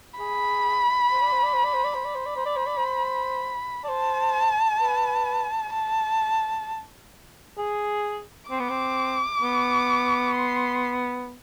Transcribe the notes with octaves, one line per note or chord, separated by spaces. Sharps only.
G#4 B5
C5
D5
C5
D5
C5
D5
C5
D5
C5
D5 B5
C5
D5
C5
D5
C5
D5
C5
D5
C5 A5
B4
A5
G#4
C4 D6
B3
C4
B3
C6